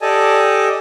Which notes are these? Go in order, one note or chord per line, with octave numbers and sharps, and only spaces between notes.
G4 A4 D5 D#5 G#5 A5